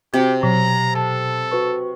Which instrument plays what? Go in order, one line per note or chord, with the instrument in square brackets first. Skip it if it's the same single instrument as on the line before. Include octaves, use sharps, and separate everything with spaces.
[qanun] C3 [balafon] C4 F#4 [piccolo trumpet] G4
[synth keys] B2 [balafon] F#3 [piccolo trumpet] A#5
[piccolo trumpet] A4 [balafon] A5
[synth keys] F#4 B4 C#6